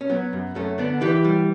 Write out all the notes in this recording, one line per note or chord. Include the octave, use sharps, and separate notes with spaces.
C#4
F#3 B3
F#2
F#2 A3 C#4
D3 B3 D4
E3 G4 B4
G3